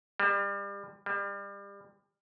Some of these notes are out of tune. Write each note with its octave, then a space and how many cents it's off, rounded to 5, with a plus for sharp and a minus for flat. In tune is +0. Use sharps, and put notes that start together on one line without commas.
G3 +35
G3 +35